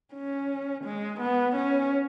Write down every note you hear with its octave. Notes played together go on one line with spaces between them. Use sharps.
C#4
G#3
B3
C#4